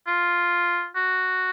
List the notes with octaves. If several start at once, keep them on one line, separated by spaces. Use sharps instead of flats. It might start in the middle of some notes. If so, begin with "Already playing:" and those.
F4
F#4